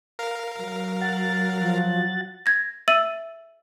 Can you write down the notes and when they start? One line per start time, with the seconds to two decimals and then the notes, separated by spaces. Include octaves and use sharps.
0.19 A#4 F5
0.57 F#3
1.01 F#5 A6
1.60 F3
2.46 G#6 A#6
2.88 E5 E6 A6 D#7 F#7